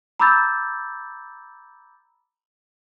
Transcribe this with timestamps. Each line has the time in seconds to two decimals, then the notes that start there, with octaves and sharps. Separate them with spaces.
0.20 A#5 B5 D6 E6 G6 A6